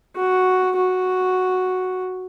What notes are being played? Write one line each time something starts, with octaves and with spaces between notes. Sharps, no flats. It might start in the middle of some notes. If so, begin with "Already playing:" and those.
F#4
F#4